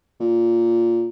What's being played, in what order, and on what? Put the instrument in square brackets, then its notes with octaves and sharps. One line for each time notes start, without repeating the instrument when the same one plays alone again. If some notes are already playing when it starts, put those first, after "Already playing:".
[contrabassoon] A#2